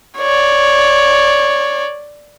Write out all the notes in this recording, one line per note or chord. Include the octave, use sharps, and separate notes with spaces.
C#5 D5